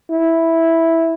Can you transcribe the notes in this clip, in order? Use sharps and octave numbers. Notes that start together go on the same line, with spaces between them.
E4